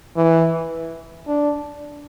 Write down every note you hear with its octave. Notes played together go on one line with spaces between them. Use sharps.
E3
D4